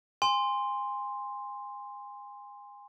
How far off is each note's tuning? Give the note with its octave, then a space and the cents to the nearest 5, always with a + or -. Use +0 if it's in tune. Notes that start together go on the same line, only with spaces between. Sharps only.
G#5 -30 C6 +0